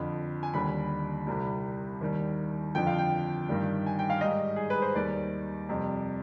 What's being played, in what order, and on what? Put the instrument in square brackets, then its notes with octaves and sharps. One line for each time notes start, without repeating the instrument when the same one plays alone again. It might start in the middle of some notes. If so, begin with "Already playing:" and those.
Already playing: [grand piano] F2 D3 F3 B5
G#5
D#2 D3 G3 B5
C2 C3 G3
D#2 D#3 G3
F2 D3 F3 G5
F5
G5
G2 D#3 G3
G#5
G5
F5
G#2 G3 D#5
G#4
B4
C5
D#2 D#3 G3 D5
F2 C3 G3